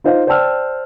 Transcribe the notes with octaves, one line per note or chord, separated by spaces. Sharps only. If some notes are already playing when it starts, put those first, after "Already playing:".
D#4 F4 C5 D#5 F5
C5 D5 G5 A5 E6 F6